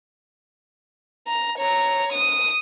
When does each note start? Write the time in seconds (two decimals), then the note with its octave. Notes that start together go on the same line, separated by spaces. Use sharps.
1.28 A#5
1.58 C#5 A#5
2.13 D#6